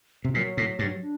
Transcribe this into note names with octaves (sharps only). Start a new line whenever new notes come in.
C3
A#2 F#3
A2
G2
D4